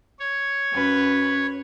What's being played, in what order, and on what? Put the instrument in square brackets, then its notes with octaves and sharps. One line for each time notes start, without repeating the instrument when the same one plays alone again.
[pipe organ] C#5
[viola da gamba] F#2 C#4 B4